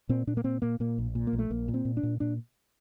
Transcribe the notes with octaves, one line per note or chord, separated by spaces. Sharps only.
A#2 C4
A#2 D4
A#3
A#2 C4
A#2 A#3
A#2 A#3
A#1
A#2
A#3
A#1
A3
A#1 A#3
A#2
C4
A#2
D4
A#2
A#2 D4